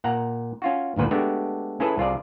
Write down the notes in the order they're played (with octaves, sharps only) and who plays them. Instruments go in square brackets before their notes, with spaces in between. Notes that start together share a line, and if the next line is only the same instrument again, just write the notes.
[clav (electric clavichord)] A#2 F#5 A#5
C#4 F4 F#4
G#1 D2 A#2 B4 C5
G#3 A3 B3 D4 F#4 G4
C#4 E4 G#4 A4 B4
C2 F4 G#4 D5